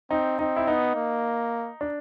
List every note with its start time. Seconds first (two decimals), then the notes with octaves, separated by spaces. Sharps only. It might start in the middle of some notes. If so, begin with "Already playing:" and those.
0.10 C4 D#4
0.39 C4 D#4
0.56 E4
0.67 B3 D#4
0.95 A#3
1.81 D4